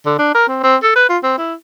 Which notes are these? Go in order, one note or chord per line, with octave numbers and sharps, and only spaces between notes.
D3
D4
A#4
C4
C4
A4
B4
F4
C4
E4